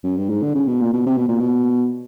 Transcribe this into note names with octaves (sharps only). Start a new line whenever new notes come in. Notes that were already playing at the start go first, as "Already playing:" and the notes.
F#2
G2
G#2
D3
C#3
B2
A#2
B2
C3
B2
A#2
B2